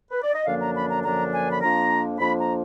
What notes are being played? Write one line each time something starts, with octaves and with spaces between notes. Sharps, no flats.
B4
D5
D#5
F#2 D3 F3 A#3 D4 F5
A#5
B5
A#5
F#2 D3 F3 A#3 D4 A#5
G#5
B5
F2 F3 A#3 D4 A#5
F2 F3 A#3 D4 B5
A#5